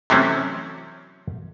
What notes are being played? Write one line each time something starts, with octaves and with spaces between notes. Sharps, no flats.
C3 E3 F#3 A3 C4 C#4